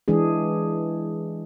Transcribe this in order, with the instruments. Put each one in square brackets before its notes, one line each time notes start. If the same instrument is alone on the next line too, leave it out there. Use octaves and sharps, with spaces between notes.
[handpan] E3 G#3 D4 G#4